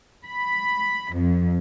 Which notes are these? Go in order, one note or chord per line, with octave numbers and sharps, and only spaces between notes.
B5
F2